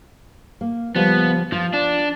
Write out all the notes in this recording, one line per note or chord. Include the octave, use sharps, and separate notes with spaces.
A#3
C#3 F3 G3 B3
F3 F4
D4